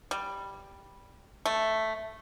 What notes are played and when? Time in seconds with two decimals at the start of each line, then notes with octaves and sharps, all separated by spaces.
0.11 G3
1.46 A3